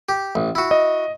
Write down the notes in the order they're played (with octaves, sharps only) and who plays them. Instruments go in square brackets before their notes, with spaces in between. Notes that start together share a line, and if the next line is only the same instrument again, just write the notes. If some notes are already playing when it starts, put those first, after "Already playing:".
[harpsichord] G4
A1
E4 F#4
[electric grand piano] D#5